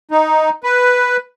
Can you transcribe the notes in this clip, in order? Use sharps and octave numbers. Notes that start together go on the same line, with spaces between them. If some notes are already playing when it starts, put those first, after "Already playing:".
D#4
B4